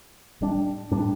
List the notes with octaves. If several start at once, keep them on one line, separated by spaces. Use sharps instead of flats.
A2 G3 D4
A2 G3 D4